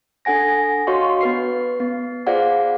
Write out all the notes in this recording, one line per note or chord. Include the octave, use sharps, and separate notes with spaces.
D4 A4 F#5 G#5 A#6
F#4 C#5 D#5 F5 C6 C#6
B3 B4 C7
B3
F4 G#4 C5 D5 F5 F#5